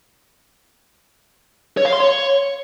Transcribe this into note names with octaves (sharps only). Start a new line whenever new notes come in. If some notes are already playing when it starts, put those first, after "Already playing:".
C#5
F5
C6
C#5